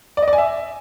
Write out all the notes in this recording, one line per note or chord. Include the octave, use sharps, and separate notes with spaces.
D5
D#5
D5
G#5
E5